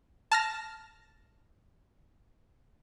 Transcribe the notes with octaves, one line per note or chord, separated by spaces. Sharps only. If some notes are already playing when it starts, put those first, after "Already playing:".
A5 F6 A#6